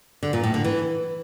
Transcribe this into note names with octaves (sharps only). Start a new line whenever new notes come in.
D3
A#2
A2
D3
E3